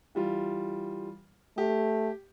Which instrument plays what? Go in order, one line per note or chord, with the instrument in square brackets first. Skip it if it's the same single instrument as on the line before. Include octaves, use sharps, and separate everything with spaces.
[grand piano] E3 G3 F4
[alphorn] A3 [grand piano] G4